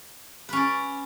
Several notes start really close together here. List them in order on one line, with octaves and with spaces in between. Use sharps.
B4 C#4 D5